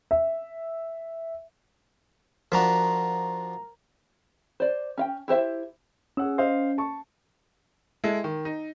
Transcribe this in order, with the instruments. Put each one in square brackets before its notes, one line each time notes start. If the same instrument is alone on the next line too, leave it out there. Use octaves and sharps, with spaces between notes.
[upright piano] E5
[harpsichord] F3 D4 F#4 [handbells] A#4 A#5
[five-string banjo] C5 D5
C#4 F5 G5
E4 G4 C5 E5
[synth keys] C#4 [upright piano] G#4 F#5 E6
[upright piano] C5 D#5 F5
A5 C#6
[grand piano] G#3 E4 A4
D#3
D#4